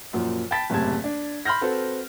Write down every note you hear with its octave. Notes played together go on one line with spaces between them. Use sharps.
F#2 A#2 F3
G5 A5 B5 A6 B6
F#1 A2 C3 A5 G#6
D4
B5 C6 F6 G6 A#6
C4 F#4 A4 B4